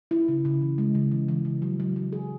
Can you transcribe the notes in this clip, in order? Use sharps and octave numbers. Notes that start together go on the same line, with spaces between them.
E4
C#3
C#3
E3
G#3
C#3
E3
E3
C#3
F#3
F#3
F#3
G#4